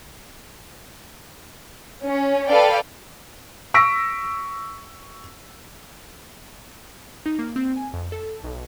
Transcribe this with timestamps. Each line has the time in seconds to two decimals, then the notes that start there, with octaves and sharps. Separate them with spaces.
2.04 C#4
2.48 A4 B4 D5 F5 G5
3.74 C#6 E6 A#6 B6 D7
7.26 D#4
7.39 A#3
7.56 C4
7.76 G#5
7.93 F2
8.12 A4
8.44 B1